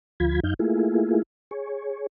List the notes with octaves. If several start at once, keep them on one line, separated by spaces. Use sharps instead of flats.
D2 F3 F4 B5 G#6
F#2 D#4 F5 G6
A3 A#3 E4 F4 G#4
G#4 C#5